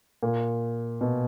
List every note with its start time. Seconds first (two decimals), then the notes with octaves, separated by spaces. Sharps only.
0.23 A#2
1.01 B2